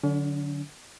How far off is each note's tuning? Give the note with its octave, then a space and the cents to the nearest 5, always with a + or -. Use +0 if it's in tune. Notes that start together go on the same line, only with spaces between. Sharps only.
D3 +0 F#3 -15 C#4 +45